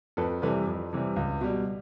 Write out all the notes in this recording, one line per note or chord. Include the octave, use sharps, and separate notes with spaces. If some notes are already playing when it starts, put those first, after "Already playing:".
F2 A4 B4
C3 E3 G3 A4 B4
F2
C3 E3 G3
C#2
B2 G3